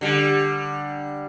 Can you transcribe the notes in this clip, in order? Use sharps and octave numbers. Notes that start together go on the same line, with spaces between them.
D3 G3